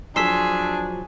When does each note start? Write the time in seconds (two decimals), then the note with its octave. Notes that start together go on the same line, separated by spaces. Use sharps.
0.16 F3 F#3 D4 G#4 C6 E6 B6